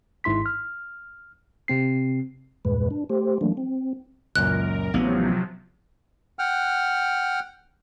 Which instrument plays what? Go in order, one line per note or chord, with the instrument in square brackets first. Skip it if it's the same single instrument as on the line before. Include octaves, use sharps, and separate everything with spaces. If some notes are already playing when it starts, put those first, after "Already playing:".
[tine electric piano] G#1 G#2 E4 C6 B6
F6
C3 C4 C7
[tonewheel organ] E2 G2 A#2 G#3 B4
D4
A3 G4 C5
E3 F#3 A3 A#3 D4
C4
[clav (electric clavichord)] C#2 F#2 A#2 [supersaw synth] A#4 [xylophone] F#6
[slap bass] A1 B3 [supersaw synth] C3 F3 F#3 [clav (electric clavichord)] F5
[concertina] F#5 G5 F6